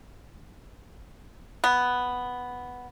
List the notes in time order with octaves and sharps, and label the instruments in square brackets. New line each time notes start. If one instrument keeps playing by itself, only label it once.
[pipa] B3